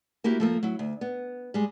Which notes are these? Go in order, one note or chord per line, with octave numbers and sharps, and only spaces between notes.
A#3 E4 F#4 G4
F3 A3 A#3
F#3 E4
D2
B3
G3 G#3